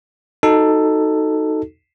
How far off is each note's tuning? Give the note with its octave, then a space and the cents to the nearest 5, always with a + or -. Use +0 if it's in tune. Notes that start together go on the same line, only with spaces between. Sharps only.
D#4 +0 F#4 +0 A4 +10